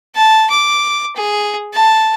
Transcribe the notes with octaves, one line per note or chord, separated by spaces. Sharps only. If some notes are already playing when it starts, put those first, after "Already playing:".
A5
D6
G#4
A5